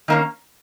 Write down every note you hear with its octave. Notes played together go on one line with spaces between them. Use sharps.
D#3 A#3 C#4